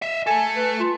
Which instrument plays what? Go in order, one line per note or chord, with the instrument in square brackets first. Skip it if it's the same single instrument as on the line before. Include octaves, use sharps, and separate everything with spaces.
[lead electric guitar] D#5 E5
[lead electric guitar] A3 A4 [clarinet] G#5
[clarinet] B4
F4